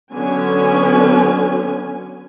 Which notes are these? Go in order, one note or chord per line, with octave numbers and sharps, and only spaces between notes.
D3 F#3 B3 C#4 G#5